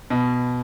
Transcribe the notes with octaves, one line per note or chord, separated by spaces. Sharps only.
B2